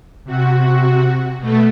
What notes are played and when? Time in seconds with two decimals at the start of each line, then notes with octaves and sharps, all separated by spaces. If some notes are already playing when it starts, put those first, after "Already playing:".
0.24 C3 F#4
1.38 B2 A3